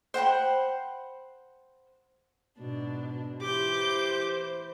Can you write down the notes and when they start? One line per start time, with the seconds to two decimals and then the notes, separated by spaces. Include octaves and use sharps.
0.14 C5 F#5 G5 B5
2.59 G#2 B2 D4
3.41 E3 G4 C5 D6 G6